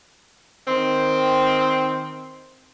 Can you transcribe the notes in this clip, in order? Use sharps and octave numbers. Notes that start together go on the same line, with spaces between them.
D#3 C4